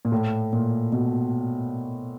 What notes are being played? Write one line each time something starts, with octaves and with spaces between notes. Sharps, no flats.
A#2
A2
A#2
B2